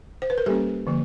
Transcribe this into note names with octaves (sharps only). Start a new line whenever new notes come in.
C5
B4
A#4
G3 A#3 C#4 G4 A4
D3 F3 A#3